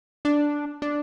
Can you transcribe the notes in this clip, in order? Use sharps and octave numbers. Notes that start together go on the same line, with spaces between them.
D4
D4